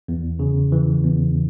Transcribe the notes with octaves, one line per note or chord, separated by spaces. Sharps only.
E2
C#3
E3
E2